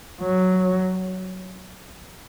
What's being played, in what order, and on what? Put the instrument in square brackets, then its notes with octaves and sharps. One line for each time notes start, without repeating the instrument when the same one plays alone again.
[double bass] F#3